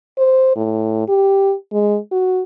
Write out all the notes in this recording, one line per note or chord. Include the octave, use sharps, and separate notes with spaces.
C5
A2
G4
G#3
F#4